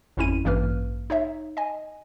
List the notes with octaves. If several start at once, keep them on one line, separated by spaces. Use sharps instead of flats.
G#1 F2 C#4 E4 D#7
A1 G2 E3 A#3 B4 F6
D#4 C#5 E5
D#5 G#5